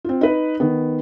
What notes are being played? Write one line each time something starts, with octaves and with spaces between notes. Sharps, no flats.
C4 F4
D#4 B4
D#3 B3